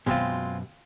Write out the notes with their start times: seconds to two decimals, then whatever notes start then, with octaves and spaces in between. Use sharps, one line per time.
0.07 F#2 B2 G#3 C4 F4